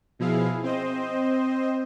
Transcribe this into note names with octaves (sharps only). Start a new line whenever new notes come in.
B2 F3 E4 G#4 F5
C4 C5 D#5